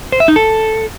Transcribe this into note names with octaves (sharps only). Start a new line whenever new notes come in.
C5
E5
D#4
A4